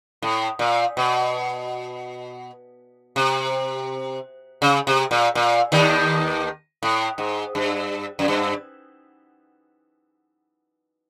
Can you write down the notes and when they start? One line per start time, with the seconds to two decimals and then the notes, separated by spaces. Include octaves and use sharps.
0.22 A2
0.59 A#2
0.97 B2
3.16 C3
4.62 C#3
4.87 C3
5.11 A#2
5.35 A#2
5.72 D#2 D#3
6.83 A2
7.18 G#2
7.55 G2
8.19 F#2
8.28 G2